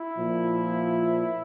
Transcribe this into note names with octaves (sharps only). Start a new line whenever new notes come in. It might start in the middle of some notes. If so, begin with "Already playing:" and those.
Already playing: E4
A#2 F3